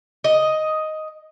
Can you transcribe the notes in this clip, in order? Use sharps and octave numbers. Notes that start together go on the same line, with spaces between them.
D#5